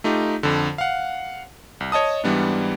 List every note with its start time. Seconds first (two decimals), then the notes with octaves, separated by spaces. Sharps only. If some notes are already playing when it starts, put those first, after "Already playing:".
0.04 A3 D#4 F4 G4
0.43 F2 D3
0.78 F5 F#5
1.80 C2
1.92 C#5 D#5 A5 D#6
2.24 G#2 E3 G3 B3 D4